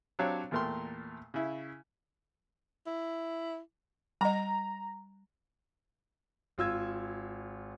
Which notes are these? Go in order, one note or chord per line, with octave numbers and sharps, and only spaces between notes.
F#3 C4 D4 G4 C#5 F5
E2 A#2 A3 A#4 G5 C6
C#3 E4
E4
G3 D#5 A#5
G#1 F4 E6 G#6